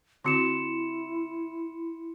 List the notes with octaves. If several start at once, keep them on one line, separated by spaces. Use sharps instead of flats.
D3 C4 E4 F#4 C6 C#7 E7